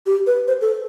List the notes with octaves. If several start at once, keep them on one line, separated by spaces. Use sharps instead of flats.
G4
B4
C5
A4